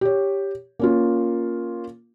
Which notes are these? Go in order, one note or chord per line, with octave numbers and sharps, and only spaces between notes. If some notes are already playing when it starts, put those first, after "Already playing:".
G4 C#5
A#3 C#4 F4